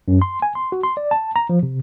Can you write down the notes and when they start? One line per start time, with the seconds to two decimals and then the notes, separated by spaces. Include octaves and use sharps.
0.08 F#2
0.22 C6
0.42 G#5
0.55 C6
0.72 F#4
0.83 C6
0.97 D5
1.11 A5
1.36 A#5
1.49 F3
1.63 C3